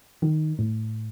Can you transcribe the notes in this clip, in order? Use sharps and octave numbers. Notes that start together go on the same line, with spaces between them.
D#3
A2